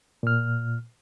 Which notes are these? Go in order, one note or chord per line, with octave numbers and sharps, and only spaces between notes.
A#2 F6